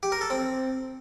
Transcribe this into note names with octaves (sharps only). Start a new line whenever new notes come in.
G4
A#4
A4
C4